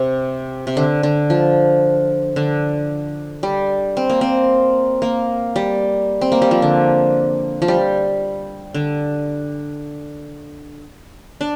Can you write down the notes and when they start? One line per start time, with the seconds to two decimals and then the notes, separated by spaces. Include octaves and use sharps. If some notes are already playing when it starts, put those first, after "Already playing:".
Already playing: C3
0.67 C3
0.77 D3
1.03 D3
1.30 F3
2.36 D3
3.43 G3
3.97 C4
4.10 A#3
4.21 C4
5.02 A#3
5.56 G3
6.21 C4
6.32 A#3
6.42 G3
6.51 F3
6.62 D3
7.62 F3
7.68 G3
8.74 D3
11.41 D4